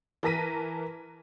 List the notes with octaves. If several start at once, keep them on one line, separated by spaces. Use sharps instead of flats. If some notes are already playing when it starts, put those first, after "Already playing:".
E3 A#4 A5 A#6 B6 D#7